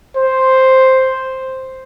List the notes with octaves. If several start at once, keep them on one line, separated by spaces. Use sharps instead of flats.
C5